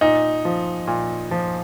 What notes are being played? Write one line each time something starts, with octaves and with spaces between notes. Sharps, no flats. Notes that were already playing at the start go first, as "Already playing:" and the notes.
A#2 D#4
F3
A#2
F3